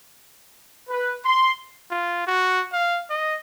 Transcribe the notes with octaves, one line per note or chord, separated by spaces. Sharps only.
B4
C6
F4
F#4
F5
D#5